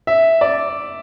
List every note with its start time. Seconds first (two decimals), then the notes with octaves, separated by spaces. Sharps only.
0.07 E5
0.41 D5